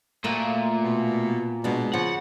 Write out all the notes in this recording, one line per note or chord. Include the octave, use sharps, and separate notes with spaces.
A#2 A3 A#3 F#4
B2
B2 G#3 D4
C#3 F3 F#5